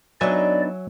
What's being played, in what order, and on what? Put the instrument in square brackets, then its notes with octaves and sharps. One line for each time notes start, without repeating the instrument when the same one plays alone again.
[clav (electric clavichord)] F#3 E5 G#5 [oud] B3 D4 D#4 [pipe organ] D5